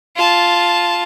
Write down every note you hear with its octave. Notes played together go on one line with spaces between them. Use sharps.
F4 A5